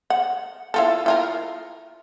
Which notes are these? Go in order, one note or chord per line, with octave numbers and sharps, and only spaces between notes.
F#5
E4 F4 A4
E4 F4 A#4